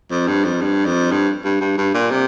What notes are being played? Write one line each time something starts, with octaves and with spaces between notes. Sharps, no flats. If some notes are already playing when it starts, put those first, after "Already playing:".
F2
G2
F2
G2
F2
G2
G2
G2
G2
A#2
C3